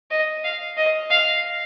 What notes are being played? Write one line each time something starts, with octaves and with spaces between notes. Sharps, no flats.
D#5
F5
D#5
F5